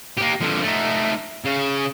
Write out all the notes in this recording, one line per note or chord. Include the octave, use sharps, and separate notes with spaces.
A#3 G4
D3 F3
A3 D#4
C#3